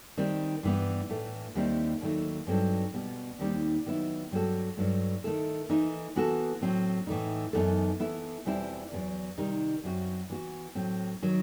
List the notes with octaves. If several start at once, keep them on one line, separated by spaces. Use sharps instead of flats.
D#3 G3 C4
G2 E3 B3
A2 E3 A3
D#2 D#3 G3 C4 E4
D#2 D#3 F#3 A3
G2 F#3 C4 D#4 A4
B2 G3 B3
D#2 D#3 G3 C4 D#4
D#3 F#3 B3 E4
G2 F#3 C4 F#4 A4
G2 F#3 A3
D#3 A3 E4 A4
E3 A3 D#4
E3 B3 F#4 A4
A2 F#3 C4
A2 E3 A3 D#4
F#2 E3 B3 D#4 A4
E3 B3 E4 A4
E2 B2 G3 C4 E4
E2 D#3 F#3
C3 D#3 G3 D#4
F#2 F#3 C4 F#4
E3 B3 F#4
A2 F#3 C4
D#3 F#3